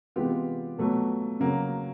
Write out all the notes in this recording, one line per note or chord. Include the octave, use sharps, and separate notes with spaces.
C3 E3 G#3 B3 F4 G4
B2 F#3 A3
C#3 F#3 A#3